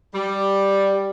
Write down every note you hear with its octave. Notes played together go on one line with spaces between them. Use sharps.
G3